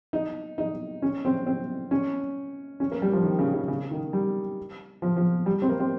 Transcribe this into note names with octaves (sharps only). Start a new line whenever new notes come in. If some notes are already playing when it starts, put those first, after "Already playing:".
D#4
D#4
C#4
C4
C4
C#4
C#4
A#3
G3
F3
D#3
C#3
C#3
C#3
D#3
G3
F3
F3
G3
C4
A#3
C4